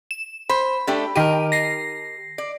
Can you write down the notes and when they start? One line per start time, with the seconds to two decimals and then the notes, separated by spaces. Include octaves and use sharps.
0.11 E7
0.49 C5 B5
0.87 A3 D4 G4
1.16 D#3 G4 A#4 D#7
1.52 A#6 C7
2.38 D5